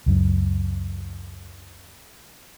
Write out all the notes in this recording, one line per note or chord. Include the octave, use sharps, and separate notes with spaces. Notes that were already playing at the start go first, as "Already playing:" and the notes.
C#2 F#2